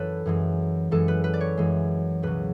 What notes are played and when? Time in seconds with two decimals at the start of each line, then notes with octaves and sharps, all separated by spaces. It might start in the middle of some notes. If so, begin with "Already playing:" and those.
Already playing: F#2 E3 A4 B4 C#5
0.26 F#2 E3 G#3
0.91 F#2 E3 G#3 A4
1.08 B4
1.24 B4
1.34 D5
1.41 C#5
1.57 F#2 E3 G#3
2.22 C#2 B2 F#3 B4